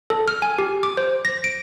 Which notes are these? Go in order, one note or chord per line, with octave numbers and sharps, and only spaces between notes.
A4
F6
G#5
G4
D6
C5
A#6
D7